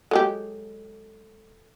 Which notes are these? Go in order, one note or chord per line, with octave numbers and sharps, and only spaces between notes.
F#3 G#3 G4 A4